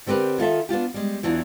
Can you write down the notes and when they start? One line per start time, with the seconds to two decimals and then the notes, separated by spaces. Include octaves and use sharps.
0.06 D3 C4 G4 A#4 B4
0.38 D#3 F4 A4 E5
0.69 B3 D4 F4 G4
0.94 G3 G#3
1.23 E2 E3 F#3 D4 F4